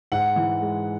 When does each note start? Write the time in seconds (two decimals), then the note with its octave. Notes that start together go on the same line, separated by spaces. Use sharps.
0.12 G#2 F#5
0.36 E3
0.62 G#3